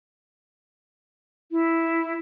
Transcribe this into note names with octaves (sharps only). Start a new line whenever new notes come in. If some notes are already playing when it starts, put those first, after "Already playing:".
E4